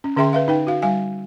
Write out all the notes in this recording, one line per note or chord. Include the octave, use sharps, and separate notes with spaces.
C#4
D3 C#4 G#4 E5 G5 C6
B4 E5 F5
D#4 B4 G5
F#4 F5
G3 F5 G#5